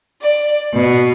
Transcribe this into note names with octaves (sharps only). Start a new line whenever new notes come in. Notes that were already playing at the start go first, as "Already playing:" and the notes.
D5
B2